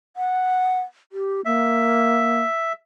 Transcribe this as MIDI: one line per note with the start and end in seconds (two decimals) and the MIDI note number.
0.17 0.80 78
1.12 1.41 67
1.45 2.41 58
1.45 2.73 76